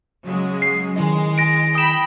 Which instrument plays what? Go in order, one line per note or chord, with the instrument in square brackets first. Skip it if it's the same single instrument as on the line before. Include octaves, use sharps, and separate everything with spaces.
[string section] C#3 F#3 G#3
[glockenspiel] C7
[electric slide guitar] D#3 E4 D#5 [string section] G#3
[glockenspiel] A#6 D7
[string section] G5 B5 [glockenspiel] D#6 E7